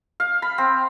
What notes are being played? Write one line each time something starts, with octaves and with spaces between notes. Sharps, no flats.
F5
B5
C4